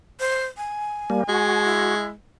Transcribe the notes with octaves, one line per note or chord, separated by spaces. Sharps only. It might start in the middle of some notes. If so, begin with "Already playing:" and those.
C5
G#5
G3 A#3
G#3 F#4
E4